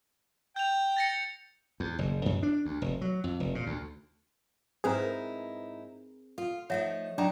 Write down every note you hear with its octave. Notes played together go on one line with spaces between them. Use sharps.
G5 G6 F7
A6 A#6 C#7
E2
F#1
F#2
D4
D2
F1
F#3
F2
F1
A#2
D2
G#2 C4 D#4 E4 G#4 B4 C5 A#5
A#4
F4 A4
F3 A3 D#4 C#5 E5 F#5
F#3 D4 D#4 D5 G5 A#5